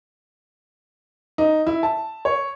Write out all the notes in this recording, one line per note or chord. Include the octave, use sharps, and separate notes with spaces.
D#4
E4
A5
C#5